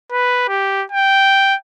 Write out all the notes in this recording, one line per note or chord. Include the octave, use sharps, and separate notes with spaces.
B4
G4
G5